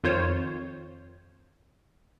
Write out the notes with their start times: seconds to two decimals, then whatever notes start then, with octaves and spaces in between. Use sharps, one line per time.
0.03 F2 D#3 F4 C5 C#5